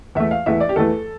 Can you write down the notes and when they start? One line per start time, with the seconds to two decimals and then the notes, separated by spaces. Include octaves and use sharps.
0.15 E2 E3 A3 E5
0.31 F5
0.46 E2 E3 A3 E5
0.60 D5
0.69 G4
0.76 E2 E3 A3 A4